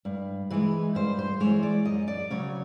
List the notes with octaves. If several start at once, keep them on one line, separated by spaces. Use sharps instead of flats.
G2
E3 G#3 B4
G2 C5
C5
E3 G#3 C#5
D5
F#2 D#5
D5
C#3 F#3 C#5